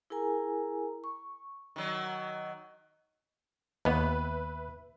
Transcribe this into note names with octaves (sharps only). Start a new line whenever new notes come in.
E4 G#4 A#4 G#5 A#5
C#6
D#3 F#3
D#2 B3 B4 E5